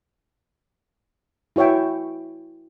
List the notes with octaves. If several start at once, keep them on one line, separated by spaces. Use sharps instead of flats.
E4 F#4 C#5 E5 G5